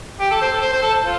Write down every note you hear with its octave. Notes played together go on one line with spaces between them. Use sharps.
G4
A4
C5
A4
C5
C5
A4
F4